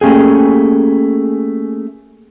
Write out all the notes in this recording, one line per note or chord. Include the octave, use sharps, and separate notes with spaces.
A3 A#3 C#4 G4 G#4